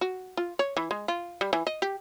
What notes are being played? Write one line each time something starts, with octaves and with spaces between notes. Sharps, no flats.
F#4
F4
C#5
E3
G#3
F4
G3
E3
D#5
G4